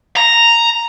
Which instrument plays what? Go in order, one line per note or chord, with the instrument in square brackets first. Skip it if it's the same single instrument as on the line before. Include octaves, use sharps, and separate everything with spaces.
[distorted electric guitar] A#5